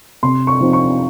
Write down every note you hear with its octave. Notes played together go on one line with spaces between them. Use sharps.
C3 C6
C#6
F3 C4 D#4
C#6